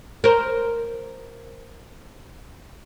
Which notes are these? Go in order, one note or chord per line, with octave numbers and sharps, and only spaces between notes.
A#4 C5